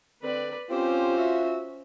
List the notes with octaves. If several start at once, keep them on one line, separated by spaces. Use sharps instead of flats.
D3 C4 B4 D5
C4 C#4 F4 G4 C5
F#4 E5